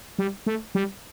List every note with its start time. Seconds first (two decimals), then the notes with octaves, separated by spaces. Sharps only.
0.19 G3
0.46 A3
0.75 G3